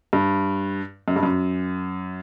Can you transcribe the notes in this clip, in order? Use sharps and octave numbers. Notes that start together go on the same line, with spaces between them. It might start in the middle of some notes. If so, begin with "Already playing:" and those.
G2
F#2
G2
F#2